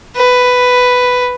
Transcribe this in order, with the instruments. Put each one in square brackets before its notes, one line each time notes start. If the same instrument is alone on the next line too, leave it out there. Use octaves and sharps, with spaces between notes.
[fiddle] B4